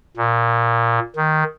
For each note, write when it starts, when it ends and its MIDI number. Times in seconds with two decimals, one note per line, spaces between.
0.17 0.99 46
1.16 1.44 51